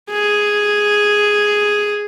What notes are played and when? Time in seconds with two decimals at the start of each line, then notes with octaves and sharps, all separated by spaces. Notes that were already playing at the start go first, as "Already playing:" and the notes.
0.10 G#4